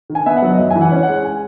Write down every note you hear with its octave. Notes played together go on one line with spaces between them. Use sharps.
D#3
G#5
B3 E5
F#5
F#3
D#5
F#2 E5
G#5
E3
F#5
C#4
F#5
G#3
G#5